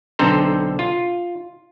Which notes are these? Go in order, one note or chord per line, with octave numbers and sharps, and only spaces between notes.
B1 D3 C4 A4 C5 A#5
F4